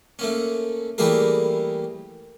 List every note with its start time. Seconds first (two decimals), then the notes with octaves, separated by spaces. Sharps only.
0.19 A3 A#3 C#4
0.98 E3 G3 A3 A#3 G#4 A#4